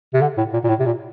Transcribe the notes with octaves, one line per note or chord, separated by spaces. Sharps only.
C3
D3
A2
A#2
A#2
A2
C3
A#2